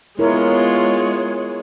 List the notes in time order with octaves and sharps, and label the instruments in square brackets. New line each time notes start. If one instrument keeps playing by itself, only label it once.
[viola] G#3 [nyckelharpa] B3 F4 [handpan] E4 A#4 [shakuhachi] C#5